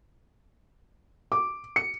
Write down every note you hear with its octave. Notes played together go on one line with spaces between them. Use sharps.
D6
C#7